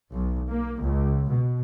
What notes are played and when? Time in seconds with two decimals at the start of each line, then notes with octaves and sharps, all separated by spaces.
0.12 B1
0.50 A#3
0.80 C#2
1.29 B2